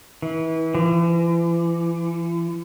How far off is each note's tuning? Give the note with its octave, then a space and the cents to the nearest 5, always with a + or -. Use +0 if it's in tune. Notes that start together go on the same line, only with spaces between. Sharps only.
E3 -30
E3 +40